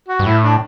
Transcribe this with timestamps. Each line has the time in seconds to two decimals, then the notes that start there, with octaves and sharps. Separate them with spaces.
0.09 F#4
0.19 G2
0.26 A2 E4
0.44 D4